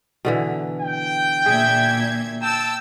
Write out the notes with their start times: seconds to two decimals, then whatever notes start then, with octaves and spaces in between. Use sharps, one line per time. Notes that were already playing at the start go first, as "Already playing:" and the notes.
0.25 B2 D3 E3
0.81 G5
1.46 A#2 G#4 E5 G#6
2.43 G5 A5 E6